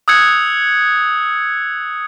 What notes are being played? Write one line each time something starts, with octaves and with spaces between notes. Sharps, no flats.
D#6 E6 F#6 G#6 C#7